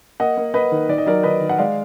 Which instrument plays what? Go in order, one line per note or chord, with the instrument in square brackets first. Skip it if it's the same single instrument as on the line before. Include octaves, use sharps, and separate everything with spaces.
[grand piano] A#3 D#5 F#5
A#3
A#3 B4 D#5
D#3
D#3 D5
D#5
F#3 A#4 D5
D#3 B4 D#5
D#3
F#5
G#3 D5 F5